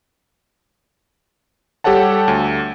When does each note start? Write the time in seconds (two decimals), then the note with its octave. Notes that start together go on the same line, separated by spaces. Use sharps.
1.84 G3 G4 A4 C#5 F#5 A5
2.28 D2